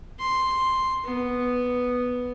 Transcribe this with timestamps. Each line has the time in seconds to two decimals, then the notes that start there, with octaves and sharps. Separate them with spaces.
0.19 C6
1.05 B3